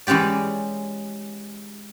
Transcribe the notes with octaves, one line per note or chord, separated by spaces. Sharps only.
E3 G#3 C#4 G4 D5